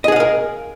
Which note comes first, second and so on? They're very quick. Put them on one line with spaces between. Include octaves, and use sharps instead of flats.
D#5 G#4 F#5 F5 A#4